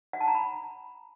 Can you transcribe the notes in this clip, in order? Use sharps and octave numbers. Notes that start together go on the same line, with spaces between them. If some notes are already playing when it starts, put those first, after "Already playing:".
F#5
A5
A#5
B5